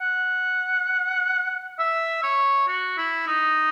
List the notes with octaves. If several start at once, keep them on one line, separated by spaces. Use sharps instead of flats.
F#5
E5
C#5
F#4
E4
D#4